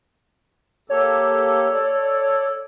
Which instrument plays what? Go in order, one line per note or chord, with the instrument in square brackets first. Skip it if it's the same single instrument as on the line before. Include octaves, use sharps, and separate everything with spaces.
[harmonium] A#3 G4 A4 [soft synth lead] C#5
[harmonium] A4 D5